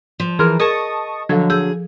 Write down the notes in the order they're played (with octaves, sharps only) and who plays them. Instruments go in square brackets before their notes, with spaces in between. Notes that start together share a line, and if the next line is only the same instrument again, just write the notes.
[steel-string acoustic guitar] F3
[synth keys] E3 A#4 [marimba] G#4 C6 F6
[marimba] G#4 A#4 [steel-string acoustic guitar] D#5 [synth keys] A5 C#6 D#6
[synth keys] D3 F#3 [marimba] F3 A4 G#6
[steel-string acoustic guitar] G#4 [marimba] E6 G6